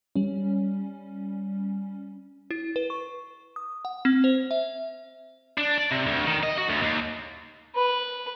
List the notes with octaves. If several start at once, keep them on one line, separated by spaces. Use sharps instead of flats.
G3 C#4
E4
B4
C#6
D#6
F#5
C4
C5
E5
D4
D5
C3
D2
D#3
D#5
F#4
D2
D#2
B4